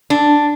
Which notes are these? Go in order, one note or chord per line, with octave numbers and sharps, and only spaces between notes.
D4